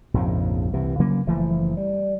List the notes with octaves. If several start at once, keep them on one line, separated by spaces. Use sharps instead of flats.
A#1 F2 G#2 C#3
C2 C3 E3
C#3 F#3 A#3 C#4
F#1 E3 F3 A3
G3